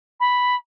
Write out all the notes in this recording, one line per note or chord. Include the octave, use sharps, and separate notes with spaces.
B5